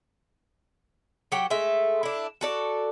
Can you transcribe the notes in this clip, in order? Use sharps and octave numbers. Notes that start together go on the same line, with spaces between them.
F#3 G4 F#5 G5
G#3 A3 E5
D4 E4
F#4 A4 D5